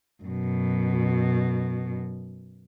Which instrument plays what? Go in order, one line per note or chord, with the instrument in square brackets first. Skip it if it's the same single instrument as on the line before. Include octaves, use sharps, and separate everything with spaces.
[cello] F#2 B2